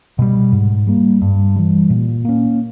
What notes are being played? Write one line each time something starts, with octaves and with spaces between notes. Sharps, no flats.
B2 G3
G#2
G3 A#3
G2
E3 G3
A#2
A#3 C#4